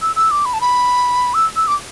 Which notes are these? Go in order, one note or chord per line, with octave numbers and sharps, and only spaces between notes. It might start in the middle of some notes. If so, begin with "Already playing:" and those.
E6
E6
D6
B5
A5
B5
E6
E6
D6